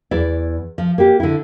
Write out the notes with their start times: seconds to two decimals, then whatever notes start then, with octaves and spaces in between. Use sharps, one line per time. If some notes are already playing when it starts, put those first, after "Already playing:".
0.11 E2 E4 D5
0.78 F3
0.98 A#3 G4
1.20 D3 E4